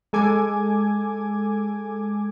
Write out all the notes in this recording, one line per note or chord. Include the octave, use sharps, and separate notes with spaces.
G#3 A4 G#5 D6 G#6